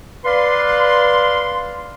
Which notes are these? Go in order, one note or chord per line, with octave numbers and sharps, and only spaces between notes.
B4 D5 F5 C6